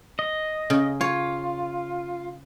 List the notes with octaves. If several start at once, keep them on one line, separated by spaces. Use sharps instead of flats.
D#5
C#3
F4 C#5